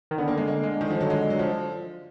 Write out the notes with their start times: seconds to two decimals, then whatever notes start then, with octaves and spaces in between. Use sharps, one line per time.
0.11 D#3
0.18 D3 B3
0.28 A#3
0.37 G#3
0.48 A#3
0.63 G#3
0.81 D#3
0.90 F3
1.01 F#3
1.10 G#3
1.30 F#3
1.39 F3